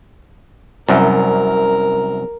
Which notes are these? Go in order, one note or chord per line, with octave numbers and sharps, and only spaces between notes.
C2 F#2 A#4